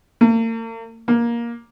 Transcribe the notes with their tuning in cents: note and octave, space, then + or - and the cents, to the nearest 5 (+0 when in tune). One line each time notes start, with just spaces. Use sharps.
A#3 -45
A#3 +15